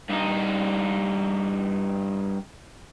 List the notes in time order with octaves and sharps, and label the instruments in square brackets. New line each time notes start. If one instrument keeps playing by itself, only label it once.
[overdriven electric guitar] G2 D#4